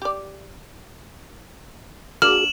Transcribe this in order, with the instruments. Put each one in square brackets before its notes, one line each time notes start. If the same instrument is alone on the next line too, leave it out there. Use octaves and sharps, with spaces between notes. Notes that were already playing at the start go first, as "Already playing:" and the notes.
[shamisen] G4 D5
[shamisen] A#3 D4 [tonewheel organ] F#4 G#4 [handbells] F6 [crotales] E7 F#7